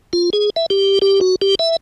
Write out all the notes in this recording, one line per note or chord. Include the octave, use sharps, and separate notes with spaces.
F4
G#4
E5
G4
G4
F#4
G4
E5